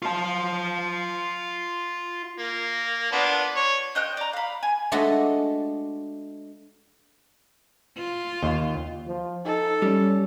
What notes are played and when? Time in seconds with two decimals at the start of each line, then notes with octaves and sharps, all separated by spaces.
0.03 F4 A5
2.38 A#3
3.12 B3 D4 F4
3.56 C#5
3.95 C5 D#5 G5 F#6
4.17 D5 A#5
4.33 F5 B5
4.63 G#5
4.92 G#3 A3 D4 F#4 A4 D#5
7.97 F4
8.43 D#2
9.07 F3
9.46 D#4 A4
9.82 G3 C#4